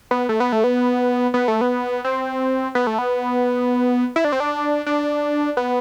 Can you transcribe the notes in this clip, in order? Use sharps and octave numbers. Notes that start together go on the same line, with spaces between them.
B3
A3
B3
A3
B3
B3
A3
B3
C4
B3
A3
B3
E4
D4
C4
D4
D4
B3